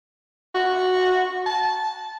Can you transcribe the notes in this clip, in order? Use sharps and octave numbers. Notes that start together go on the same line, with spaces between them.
F#4
A5